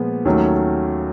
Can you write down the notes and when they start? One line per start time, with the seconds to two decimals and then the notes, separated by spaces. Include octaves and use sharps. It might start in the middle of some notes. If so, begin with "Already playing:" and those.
Already playing: A#2 F3 G#3 B3
0.25 D#2 D#3 F#3 A3 C#4